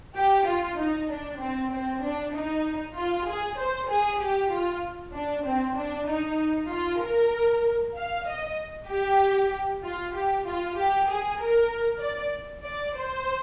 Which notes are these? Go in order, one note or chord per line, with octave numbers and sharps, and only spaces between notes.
G4
F4
D#4
D4
C4
C4
D4
D#4
F4
G#4
C5
G#4
G4
F4
D4
C4
D4
D#4
F4
A#4
F5
D#5
G4
F4
G4
F4
G4
G#4
A#4
D5
D5
C5